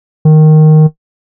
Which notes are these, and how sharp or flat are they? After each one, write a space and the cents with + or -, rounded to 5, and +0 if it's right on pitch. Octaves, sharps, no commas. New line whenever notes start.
D#3 -5